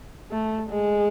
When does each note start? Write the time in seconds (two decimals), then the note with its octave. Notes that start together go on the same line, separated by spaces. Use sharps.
0.31 A3
0.71 G#3